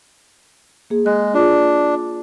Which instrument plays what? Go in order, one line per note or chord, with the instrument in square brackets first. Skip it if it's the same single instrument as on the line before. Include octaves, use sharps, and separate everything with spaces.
[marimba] A#3 G#4
[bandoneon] G#3 [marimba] F#6
[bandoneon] D4 [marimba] F4 G#4